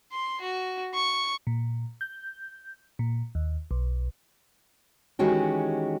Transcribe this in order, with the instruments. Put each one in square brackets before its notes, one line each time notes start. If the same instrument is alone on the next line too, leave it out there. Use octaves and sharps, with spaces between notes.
[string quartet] C6
F#4
C#6
[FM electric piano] A#2
G6
A#2
D#2
B1
[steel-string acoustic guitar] D#3 E3 G#3 C#4 F#4 G4